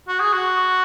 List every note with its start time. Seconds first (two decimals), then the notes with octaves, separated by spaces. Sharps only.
0.08 F#4
0.21 G#4
0.33 F#4